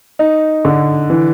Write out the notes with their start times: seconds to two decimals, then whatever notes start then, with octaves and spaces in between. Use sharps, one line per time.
0.19 D#4
0.65 D3
1.10 E3